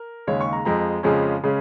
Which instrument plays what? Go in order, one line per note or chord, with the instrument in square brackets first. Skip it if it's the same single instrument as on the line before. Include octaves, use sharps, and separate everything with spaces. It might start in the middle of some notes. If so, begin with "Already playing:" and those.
Already playing: [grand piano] A#4
D#2 C#3 G#3 C#5
C#6
A#5
F2 F3 G#3 A#5
F2 C#3 F3 G#3 C#4
C#3 G#3 C#4